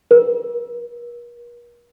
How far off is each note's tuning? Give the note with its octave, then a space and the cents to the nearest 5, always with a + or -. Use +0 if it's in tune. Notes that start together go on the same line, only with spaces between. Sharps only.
A#4 +45